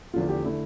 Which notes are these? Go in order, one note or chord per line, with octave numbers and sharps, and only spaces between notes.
E2 D3 F3 A3 F4
G4
D3 A3 E4